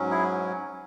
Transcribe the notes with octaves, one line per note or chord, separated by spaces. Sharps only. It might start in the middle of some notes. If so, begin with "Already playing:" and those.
Already playing: G#2 F#3 C#4
E4 G#4